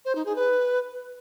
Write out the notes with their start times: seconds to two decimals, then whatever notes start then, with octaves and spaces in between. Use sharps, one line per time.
0.05 C5
0.15 D#4
0.26 G#4
0.36 B4